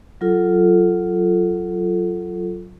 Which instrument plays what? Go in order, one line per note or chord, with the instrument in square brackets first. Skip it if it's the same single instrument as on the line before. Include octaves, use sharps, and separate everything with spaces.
[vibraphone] F#3 F4 A4